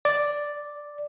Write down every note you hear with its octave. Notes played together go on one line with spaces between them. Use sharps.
D5